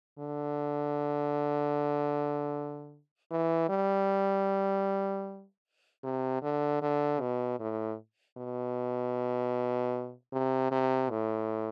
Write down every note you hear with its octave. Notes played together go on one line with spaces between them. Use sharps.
D3
E3
G3
C3
D3
D3
B2
A2
B2
C3
C3
A2